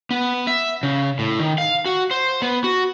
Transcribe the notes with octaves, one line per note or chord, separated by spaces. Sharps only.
B3
E5
C#3
A2
D#3
F5
F#4
C5
B3
F#4